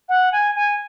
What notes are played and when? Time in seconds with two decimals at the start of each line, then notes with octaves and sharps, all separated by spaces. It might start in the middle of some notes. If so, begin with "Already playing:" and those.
0.09 F#5
0.32 G#5
0.55 G#5